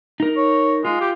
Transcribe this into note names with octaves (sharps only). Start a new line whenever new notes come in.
D#4 A#4
C#5
G#3 F4
G4